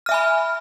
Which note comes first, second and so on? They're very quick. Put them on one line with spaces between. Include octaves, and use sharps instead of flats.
F6 E5 G#5 B5